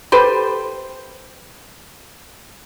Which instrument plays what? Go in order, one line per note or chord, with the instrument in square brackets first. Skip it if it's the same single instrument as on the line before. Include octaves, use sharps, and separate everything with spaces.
[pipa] G4 A4 B4 C5